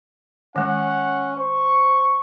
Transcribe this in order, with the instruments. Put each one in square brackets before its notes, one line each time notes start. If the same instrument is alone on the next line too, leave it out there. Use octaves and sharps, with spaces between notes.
[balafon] D#3 G#3 [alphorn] C#4 [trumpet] F#5
[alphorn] C5 [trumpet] C#6